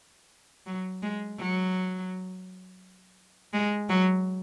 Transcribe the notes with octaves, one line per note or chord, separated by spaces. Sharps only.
F#3
G#3
F#3
G#3
F#3